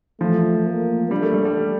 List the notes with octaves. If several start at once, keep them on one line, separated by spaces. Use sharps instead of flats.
F3 A3
A#3
G3 D4
A3
G3
G3